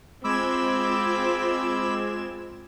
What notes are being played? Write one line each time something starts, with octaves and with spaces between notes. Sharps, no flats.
G#3 C4 F4 B5 D6 E6 G#6 E7